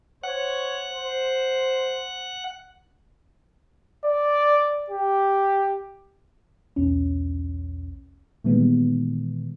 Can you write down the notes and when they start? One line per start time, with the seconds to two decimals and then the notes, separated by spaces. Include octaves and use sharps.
0.24 C5 C#5 F#5
0.91 C5
4.05 D5
4.90 G4
6.76 B1 E2 C#4
8.44 A#2 D#3 E3 G3 G#3 B3